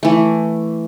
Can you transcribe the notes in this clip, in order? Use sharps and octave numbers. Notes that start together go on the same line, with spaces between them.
E3 A3